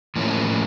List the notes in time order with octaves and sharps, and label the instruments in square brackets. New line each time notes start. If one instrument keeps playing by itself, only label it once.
[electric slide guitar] A2 F3 A#3 C#4